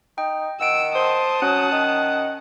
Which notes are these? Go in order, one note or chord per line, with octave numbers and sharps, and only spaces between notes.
D#4 G5
D#3 F#5 E6 D7
C5 A5 D#6
F#3 C#4 F#5
D#3